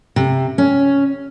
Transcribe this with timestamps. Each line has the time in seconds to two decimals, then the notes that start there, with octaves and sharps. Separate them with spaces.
0.16 C3
0.58 C#4